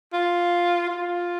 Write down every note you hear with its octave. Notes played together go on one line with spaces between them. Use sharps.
F4
F4